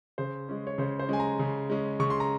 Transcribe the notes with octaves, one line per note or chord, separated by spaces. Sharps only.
C#3 C5
G#3 C#4
C#5
C#3 C5
C5
G#3 C#4 G#5
A#5
C#3
G#3 C#4
C#3 C#6
C6
A#5